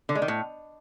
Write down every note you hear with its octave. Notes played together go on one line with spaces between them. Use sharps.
D3
G#3
D#3
A2